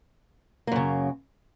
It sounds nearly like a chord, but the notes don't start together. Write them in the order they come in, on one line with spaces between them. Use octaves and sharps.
A#3 F#2 C#3